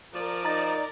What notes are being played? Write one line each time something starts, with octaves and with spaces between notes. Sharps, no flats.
F3 A#4 D5
D#4 A#5 A6